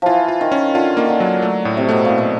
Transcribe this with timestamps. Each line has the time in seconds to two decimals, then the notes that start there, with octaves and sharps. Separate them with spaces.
0.02 E3 F3 F4
0.28 F4
0.41 D#3
0.52 C#4
0.75 D3 F4
0.97 D#3 A#3
1.09 D3
1.20 F#3
1.42 A3
1.65 A2
1.77 C3
1.89 B2 A3
2.05 A#2
2.10 A2
2.18 B2